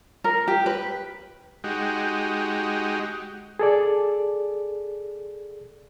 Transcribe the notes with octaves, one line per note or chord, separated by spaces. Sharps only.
A#4
G4
B4
G#3 D#4 F#4 G4
G#4 A4 D5